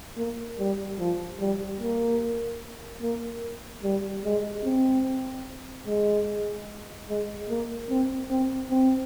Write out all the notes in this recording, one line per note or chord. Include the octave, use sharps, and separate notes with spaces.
A#3
G3
F3
G3
A#3
A#3
G3
G#3
C4
G#3
G#3
A#3
C4
C4
C4